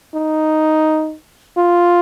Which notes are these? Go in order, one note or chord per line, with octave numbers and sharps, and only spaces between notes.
D#4
F4